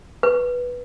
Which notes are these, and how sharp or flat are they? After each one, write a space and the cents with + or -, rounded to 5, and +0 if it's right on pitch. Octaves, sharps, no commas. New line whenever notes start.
B4 -10